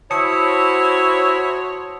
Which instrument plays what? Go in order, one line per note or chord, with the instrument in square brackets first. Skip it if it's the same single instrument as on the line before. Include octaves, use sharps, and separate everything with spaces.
[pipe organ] E4 [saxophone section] F#4 C5 C#5 [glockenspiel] A5 D#6 C#7